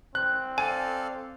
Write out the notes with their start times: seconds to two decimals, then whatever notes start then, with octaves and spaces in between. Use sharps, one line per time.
0.15 C4 F#6
0.58 A4 D5 F5 G#5